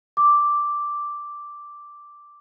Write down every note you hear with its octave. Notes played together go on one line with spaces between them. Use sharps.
D6